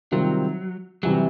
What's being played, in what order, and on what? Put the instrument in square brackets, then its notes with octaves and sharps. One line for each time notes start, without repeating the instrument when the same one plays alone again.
[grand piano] C3 D#3 G3 C4 F4 [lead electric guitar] F#3
[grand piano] C3 E3 G3 [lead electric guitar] F#3